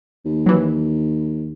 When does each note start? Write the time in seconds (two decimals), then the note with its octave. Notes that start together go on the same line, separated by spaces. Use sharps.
0.25 D#2
0.46 E3 F#3